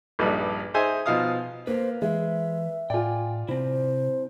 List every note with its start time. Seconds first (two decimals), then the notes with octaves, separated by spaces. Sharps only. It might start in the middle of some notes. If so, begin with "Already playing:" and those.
0.19 A#1 G2 G3 D#4 A4 B4
0.74 D#4 G#4 C5 E5 G#5
1.06 B2 F3 D#4 F5 D#6
1.67 A#3 B4 C5 F5
2.02 E3 G#3 E5
2.90 A2 F4 D5 G5 G#5
3.49 C3 C4 E4 C5